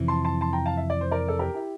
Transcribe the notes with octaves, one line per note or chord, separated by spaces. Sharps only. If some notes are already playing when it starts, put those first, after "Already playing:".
Already playing: F2 C3 E3
A5 C6
A5 C6
A5 C6
G5 A#5
F5 A5
E5
D5
C5
A#4 D5
A4
G4 A#4
E4 G4